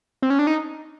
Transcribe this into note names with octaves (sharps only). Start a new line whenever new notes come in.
C4
C#4
D4
D#4